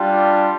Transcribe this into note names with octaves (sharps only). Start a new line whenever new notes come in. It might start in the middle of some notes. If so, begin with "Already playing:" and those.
Already playing: G3 D4 F4